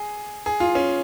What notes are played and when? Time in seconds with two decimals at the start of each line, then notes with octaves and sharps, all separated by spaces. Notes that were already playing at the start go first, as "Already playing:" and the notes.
Already playing: G#4
0.46 G#4
0.60 F4
0.75 C#4